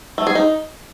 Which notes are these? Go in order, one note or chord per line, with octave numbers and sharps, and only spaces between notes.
A3
G#4
D#4